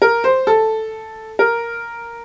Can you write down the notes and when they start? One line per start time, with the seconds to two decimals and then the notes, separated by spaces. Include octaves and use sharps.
0.02 A#4
0.24 C5
0.47 A4
1.39 A#4